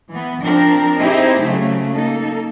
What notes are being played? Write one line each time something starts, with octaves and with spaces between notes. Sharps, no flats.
E3 B3
F3 C4 D4 A#4
C4 D#4 E4 G4 G#4 C5
C#3 F#3 A3
A#3 D#4 A4